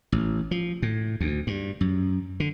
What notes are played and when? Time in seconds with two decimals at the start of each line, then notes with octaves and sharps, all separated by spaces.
0.12 A1
0.51 F3
0.82 A2
1.21 D2
1.47 G2
1.81 F#2
2.40 D3